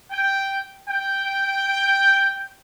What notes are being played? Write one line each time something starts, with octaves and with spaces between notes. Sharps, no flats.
G5
G5